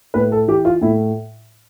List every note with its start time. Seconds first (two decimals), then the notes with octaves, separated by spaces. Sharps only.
0.14 A2 B4
0.32 A4
0.48 E3 G4
0.65 F4
0.81 A2 E4